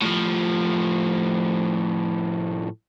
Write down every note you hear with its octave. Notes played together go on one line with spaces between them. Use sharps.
A2 F3